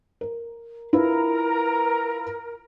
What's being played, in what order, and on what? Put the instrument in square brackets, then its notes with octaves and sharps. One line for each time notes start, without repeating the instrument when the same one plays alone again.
[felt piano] A#4
[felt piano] E4 F4 B4 [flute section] A#4